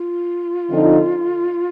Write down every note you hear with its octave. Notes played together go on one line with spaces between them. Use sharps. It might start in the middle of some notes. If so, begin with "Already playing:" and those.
Already playing: F4
D3 F3 C4 D#4